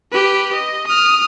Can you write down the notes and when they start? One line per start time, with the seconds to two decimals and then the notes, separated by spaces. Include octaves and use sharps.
0.12 G4 B4
0.53 D#5
0.87 D#6 F6